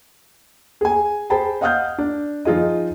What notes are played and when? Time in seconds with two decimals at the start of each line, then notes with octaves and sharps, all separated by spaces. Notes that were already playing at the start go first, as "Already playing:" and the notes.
0.81 G#4 G#5
1.30 G#4 C5 G5 A5 B5
1.61 D#5 F5 F#5 D#6 F6 G6
1.98 D4
2.45 F3 D#4 F4 G#4 D#5